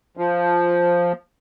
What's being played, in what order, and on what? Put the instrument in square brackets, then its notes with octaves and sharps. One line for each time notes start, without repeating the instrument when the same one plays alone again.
[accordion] F3